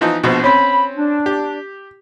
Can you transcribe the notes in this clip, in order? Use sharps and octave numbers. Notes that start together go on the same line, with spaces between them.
E3 F3 D#4
A#1 B2 F3 D4 C5
C4 C#4 B5
D4
G4